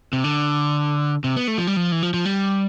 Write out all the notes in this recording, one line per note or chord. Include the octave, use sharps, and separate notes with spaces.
C3
D3
C3
B3
A3
F3
G3
F3
E3
F3
F3
G3